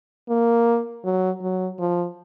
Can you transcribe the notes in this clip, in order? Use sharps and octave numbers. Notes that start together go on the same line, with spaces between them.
A#3
F#3
F#3
F3